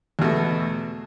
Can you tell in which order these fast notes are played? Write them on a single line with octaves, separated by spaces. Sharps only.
E2 B2 A3